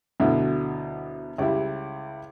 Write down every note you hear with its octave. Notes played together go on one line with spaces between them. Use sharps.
D2 B2 D3 F#3 E4
C#2 G3 E4